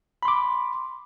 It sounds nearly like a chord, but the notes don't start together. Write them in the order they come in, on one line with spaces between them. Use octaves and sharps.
B5 C6 D6